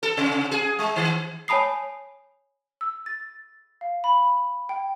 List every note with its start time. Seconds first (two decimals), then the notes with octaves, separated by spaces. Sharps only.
0.03 A4
0.17 C3
0.51 G#4
0.79 G#3
0.96 D#3
1.48 C#5 G#5 A5 B5 D#6 C7
2.81 E6
3.06 A6
3.81 F5
4.04 B5
4.69 G5